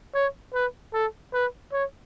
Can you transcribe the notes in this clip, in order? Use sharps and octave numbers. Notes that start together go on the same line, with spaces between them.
C#5
B4
A4
B4
C#5